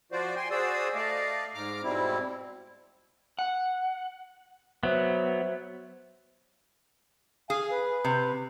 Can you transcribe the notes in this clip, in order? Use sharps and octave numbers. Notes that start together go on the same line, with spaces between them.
F3 F4 F#4 C5 D5
G5 G#5 C6
F#4 G#4 C5 D5 D#6 E6
A3 D5 D#5 F5
G#2 A#5 D6 F6
G#2 B2 G3 C4 E4
F#5
F#3 B3 C5 E5
G#4 F5 G#5
B4
C3